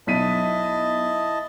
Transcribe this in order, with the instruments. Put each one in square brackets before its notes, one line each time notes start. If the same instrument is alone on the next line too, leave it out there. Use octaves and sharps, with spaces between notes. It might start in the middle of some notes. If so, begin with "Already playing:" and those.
[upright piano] B1 B6 D#7 [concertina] E4 D#5 A5